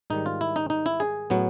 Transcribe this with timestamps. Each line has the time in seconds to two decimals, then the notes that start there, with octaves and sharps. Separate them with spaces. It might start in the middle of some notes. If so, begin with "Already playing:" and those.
0.10 G#2 D#3 G3 D#4
0.26 F4
0.41 E4
0.56 D#4
0.70 D#4
0.86 E4
1.00 G#4
1.30 A2 F#3 B3